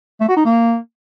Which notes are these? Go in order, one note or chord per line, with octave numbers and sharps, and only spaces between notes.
A3
F#4
D#4
A#3